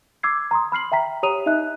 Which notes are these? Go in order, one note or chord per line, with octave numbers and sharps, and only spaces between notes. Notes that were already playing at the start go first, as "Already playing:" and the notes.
D6 E6 G#6 C7
A#5 C6 D#6
B5 F6 C7 F#7
E5 G5 A#5 B6
G4 C#5 A#5 D#6 D#7 F7
D#4 D#5 E5 F#6